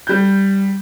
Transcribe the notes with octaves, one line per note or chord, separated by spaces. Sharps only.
G3 G6